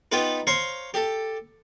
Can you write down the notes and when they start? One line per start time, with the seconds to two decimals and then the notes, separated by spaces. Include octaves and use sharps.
0.12 B3 D#4 F4 G4 B4
0.47 C5 C#5 F5 A#5 C6 C#6
0.94 G4 A4